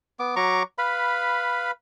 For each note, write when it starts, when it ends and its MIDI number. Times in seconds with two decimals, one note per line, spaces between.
0.19 0.35 59
0.19 0.35 86
0.36 0.63 54
0.36 0.63 82
0.36 0.63 85
0.36 0.63 86
0.78 1.71 71
0.78 1.71 77
0.78 1.71 83